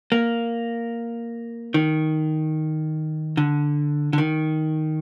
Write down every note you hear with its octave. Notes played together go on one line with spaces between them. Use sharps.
A#3
D#3
D3
D3
D#3